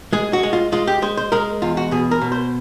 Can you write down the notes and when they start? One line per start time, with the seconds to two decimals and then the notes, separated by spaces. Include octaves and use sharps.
0.13 G#3 G#4
0.33 F#4
0.43 G#3
0.53 F4
0.72 G#3 F4
0.87 G4
1.02 G#3 C5
1.17 C5
1.32 G#3 A#4
1.62 E2 F4
1.77 F#4
1.91 B2 G#4
2.11 A#4
2.22 B2
2.32 C5